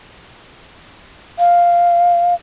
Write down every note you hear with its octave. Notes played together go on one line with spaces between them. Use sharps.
F5